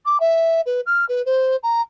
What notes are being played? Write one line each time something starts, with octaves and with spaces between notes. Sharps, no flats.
D6
E5
B4
F6
B4
C5
A#5